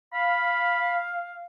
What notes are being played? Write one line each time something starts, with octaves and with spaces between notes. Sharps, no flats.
F5 B5